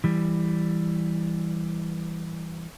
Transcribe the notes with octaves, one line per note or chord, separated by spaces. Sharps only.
E3 G3